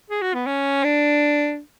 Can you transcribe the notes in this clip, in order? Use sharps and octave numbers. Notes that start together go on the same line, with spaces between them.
G#4
F#4
B3
C#4
D4